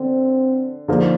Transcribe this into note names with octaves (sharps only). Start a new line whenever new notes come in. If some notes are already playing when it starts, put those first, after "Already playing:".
Already playing: D3 C4
D3 F3 A#3 D#4